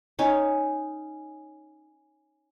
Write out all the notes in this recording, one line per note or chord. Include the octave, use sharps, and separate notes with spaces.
C#4 D#4 C#5